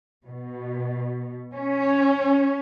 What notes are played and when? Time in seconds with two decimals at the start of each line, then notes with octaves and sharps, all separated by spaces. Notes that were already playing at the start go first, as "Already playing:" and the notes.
0.23 B2
1.54 C#4